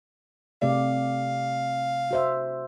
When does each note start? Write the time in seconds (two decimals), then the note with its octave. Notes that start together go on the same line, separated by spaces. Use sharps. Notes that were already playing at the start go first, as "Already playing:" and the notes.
0.62 C3 A3 D5 F5
2.11 F#4 C5 E5